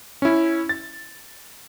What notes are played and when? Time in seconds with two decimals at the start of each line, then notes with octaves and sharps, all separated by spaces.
0.22 C#4 E4
0.69 A6